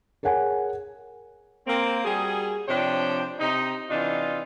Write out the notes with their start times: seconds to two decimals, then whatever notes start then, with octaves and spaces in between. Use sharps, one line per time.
0.23 G#4 A#4 C#5 F#5 G#5
1.67 A#3 C4
2.05 G3 F#4 G#4
2.68 C3 F3 D4 C#5 G5
3.39 C3 D#4
3.90 C3 E3 D4 D#4 F4